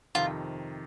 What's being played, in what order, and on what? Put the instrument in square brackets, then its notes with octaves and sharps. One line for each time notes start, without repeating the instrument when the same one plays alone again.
[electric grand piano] F2 C3 D#3 [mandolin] F4